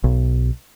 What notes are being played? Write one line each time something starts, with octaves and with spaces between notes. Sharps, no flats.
B1